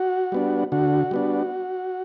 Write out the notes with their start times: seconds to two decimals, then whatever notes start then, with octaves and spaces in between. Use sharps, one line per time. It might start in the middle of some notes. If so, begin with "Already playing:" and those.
Already playing: F#4
0.32 G3 B3 D4
0.72 D3 F#4
1.11 G3 B3 D4